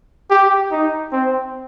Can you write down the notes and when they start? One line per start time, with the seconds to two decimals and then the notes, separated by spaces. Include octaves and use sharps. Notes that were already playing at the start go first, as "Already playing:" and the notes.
0.30 G4
0.71 D#4
1.13 C4